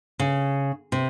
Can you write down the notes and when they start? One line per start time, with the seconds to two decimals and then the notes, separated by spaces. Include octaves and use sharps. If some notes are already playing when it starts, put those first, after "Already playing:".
0.19 C#3
0.92 C3